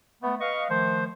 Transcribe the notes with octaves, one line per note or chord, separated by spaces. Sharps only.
A3 B3
B4 D#5 F5 C#6
D#3 F3 A3 C5